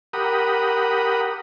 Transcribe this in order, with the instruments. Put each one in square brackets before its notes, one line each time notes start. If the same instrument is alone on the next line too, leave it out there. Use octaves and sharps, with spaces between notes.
[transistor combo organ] G4 A#4 F#5 B5 D#6